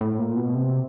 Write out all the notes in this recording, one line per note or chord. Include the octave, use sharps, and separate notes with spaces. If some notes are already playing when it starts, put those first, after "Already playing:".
A2
A#2
B2
C3